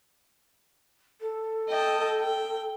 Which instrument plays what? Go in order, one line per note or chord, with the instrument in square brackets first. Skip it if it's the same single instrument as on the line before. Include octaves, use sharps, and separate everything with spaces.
[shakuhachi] A4
[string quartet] D#5 G5 A5
G5